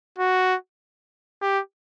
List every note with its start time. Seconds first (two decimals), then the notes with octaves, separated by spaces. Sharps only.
0.19 F#4
1.41 G4